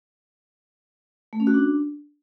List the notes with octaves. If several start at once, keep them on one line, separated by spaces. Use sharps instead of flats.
A3
C#4
F#4
D4